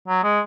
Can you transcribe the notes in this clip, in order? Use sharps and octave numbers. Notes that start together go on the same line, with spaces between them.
F#3
G#3